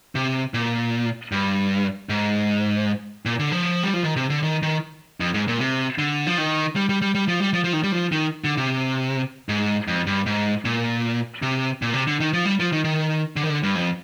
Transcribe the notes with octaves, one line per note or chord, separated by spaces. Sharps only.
C3
A#2
G2
G#2
A#2
D3
F3
G3
F3
D#3
C3
D3
D#3
D#3
F2
G#2
A#2
C3
D3
F3
D#3
G3
G3
G3
G3
F3
G3
F3
F3
D#3
G3
F3
D#3
D3
C3
G#2
F2
G2
G#2
A#2
C3
A#2
C3
D3
D#3
F3
G3
F3
D#3
D#3
D3
D#3
D3
G2
F2